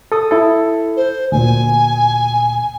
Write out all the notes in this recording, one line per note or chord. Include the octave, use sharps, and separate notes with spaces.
A4 D#6
E4 A4
C5
D2 A#2 G#5